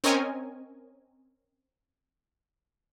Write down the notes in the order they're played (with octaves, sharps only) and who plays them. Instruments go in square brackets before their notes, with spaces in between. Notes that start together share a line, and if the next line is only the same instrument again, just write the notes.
[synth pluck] C4 C#4 A#4 C#5 D#5 G#5